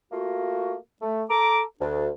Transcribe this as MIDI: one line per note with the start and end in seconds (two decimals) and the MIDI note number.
0.12 0.75 57
0.12 0.75 58
0.12 0.75 65
0.12 0.75 66
1.02 1.23 57
1.30 1.62 69
1.30 1.62 82
1.30 1.62 86
1.80 2.08 38
1.80 2.08 62